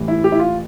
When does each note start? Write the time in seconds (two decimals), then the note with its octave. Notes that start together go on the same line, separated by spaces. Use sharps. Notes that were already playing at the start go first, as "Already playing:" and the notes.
Already playing: A1 A2 E3 G3
0.08 E4
0.24 G4
0.32 E4
0.39 F4